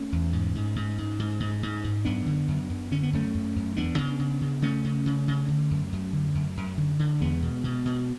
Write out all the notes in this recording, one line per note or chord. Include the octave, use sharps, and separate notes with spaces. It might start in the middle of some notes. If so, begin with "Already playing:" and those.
Already playing: A3 C#4
E2
G#2
G#2
G#2
G#2
G#2
G#2
G#2
G#2
F#2 B3 D4
D3
F#2
F#2
D3 C#4
B3
F#2 A3 C#4
F#2
F#2
E2 B3 D4
C#3
C#3
C#3
C#3 A3 C#4
C#3
C#3
C#3
D3
F#2
F#2
D3
F#2
F#2
D3
D3
E2 G#3 B3
B2
B2
B2